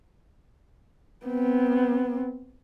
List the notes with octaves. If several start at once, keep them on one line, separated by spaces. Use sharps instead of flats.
B3 C4